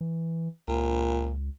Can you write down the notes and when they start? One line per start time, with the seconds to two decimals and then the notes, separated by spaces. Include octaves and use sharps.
0.01 E3
0.68 C#2 A#2